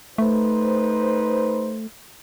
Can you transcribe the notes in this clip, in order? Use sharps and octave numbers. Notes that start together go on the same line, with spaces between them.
A3 D#4 B4 C5